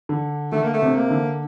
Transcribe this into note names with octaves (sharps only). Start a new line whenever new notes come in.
D3
D3 A3
A#3
A3
C3
A#3
D3